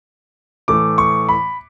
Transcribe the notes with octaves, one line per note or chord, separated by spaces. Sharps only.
A2 E3 A3 D6
C#6
B5